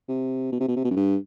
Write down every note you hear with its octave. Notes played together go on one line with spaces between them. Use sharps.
C3
B2
C3
B2
C3
B2
F#2
G2